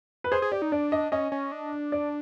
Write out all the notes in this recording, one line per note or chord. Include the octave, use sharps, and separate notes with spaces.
B4
G#4 C5
G#4
G4 D5
D#4
D4 D5
D#5
C#4 D#5
C#4
D4
D5